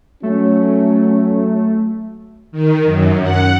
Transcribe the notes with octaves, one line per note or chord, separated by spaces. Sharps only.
F#3 A3 C#4
D#3
F#2
F#5